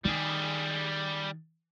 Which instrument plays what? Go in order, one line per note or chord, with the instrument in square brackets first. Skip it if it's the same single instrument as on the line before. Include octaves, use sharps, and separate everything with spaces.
[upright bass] D#3 [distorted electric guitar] G3 G#4